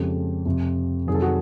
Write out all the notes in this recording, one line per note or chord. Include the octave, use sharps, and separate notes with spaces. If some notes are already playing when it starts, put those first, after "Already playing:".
Already playing: F2 C#3 F3 G#3 G4 A4
F2 C3 F3
F2 C3 D#3 F#3 G#4
A4
F#4 G#4